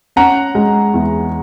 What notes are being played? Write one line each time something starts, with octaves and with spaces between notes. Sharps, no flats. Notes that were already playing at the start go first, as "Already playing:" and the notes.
C#4 F#5 A#5
G#3
E2